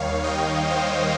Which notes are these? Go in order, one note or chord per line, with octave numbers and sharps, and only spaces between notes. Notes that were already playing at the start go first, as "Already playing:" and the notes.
Already playing: D#2 D#3 G3 C#5 F5
D#5 G5
C5 D#5